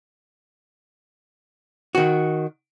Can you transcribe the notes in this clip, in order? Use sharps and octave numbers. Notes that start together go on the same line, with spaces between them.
D#3 F#4